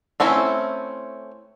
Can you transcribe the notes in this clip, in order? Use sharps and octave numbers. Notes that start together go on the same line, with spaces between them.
A3 C4 C#4 E4